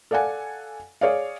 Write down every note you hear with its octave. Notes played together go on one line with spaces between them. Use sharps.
A4 D5 F5 F#5 G#5
G#4 C#5 D5 F5